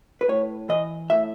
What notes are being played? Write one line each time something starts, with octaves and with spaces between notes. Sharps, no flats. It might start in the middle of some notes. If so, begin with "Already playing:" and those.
B4
A2 C#5
E3 D#5
A2 E5